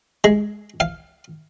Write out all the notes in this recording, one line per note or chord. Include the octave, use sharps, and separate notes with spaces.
G#3
F5